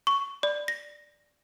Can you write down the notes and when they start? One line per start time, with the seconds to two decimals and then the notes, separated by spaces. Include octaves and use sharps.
0.07 C#6
0.43 D5
0.68 A#6